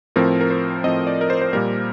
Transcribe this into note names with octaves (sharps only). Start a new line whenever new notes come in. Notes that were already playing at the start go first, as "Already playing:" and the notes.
A2 F3 C4 A#4
A#4
C5
A2 F3 C4 D#5
D5
A#4
C5
C5
A#2 G3 A#3 A#4